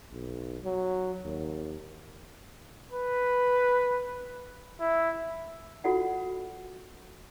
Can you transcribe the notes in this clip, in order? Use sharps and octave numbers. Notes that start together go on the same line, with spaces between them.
B1
F#3
D#2
B4
E4
F4 F#4 A4 D5 F#5